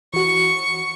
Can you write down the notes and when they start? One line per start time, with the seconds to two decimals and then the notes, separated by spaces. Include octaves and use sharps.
0.14 E3 F#4 C#6